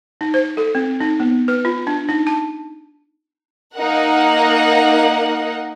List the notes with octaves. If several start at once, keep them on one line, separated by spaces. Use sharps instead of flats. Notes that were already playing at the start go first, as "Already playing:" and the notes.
D#4
C5
A4
C4
D#4
B3
B4
F4
D4
D#4
A5
A#3 D#4 A#4 F#5